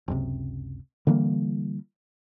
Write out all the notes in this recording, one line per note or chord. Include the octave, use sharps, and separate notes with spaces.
F#1 C#2 C3
D3 E3 G3 A#3